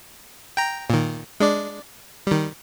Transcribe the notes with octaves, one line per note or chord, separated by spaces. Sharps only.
G5 A#5
A#2 D#3
G#3 D4 D5
D#3 G3